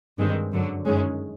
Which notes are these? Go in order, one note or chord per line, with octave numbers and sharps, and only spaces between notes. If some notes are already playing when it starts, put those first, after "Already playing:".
G2 D#3 G#3 C4
F#2 D3 F#3
F#2 D#3 G#3 C#4